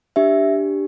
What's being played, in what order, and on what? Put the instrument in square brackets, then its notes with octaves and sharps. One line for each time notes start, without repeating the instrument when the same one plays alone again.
[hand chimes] D4 G4 E5